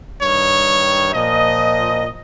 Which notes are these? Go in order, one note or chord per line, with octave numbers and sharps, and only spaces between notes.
G2 D#3 C#5
A#2 F3 D#5